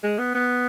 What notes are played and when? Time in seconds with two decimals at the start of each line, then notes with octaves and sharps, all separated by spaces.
0.04 G#3
0.19 B3
0.35 B3